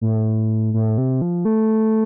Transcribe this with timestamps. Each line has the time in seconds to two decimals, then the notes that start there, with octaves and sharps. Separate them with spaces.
0.01 A2
0.74 A2
0.98 C3
1.21 F3
1.45 A3